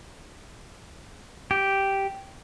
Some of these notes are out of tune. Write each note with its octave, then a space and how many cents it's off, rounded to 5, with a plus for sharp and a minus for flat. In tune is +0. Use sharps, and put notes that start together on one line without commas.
G4 -5